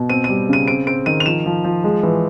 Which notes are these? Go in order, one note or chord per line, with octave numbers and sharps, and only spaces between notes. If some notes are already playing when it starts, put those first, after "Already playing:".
Already playing: B2
C4 D#7
G3 D#7
C#3 D#7
C4 D7
C4 D7
D#3 D#7
F7
F3 E7
F3
F3
G#3
E3